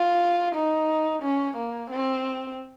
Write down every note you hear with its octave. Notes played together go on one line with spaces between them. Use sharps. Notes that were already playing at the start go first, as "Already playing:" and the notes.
Already playing: F4
D#4
C#4
A#3
C4